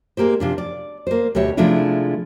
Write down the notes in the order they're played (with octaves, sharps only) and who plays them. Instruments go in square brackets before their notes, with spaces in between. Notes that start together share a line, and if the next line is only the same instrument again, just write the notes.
[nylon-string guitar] G#3 A#3 G4 C5
C3 F3 D4
D5
A#3 C5
D2 B2 G4 C#5 E5
C3 F3 G#3 A3 D4 E4